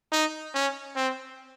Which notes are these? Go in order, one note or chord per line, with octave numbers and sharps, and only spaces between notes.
D#4
C#4
C4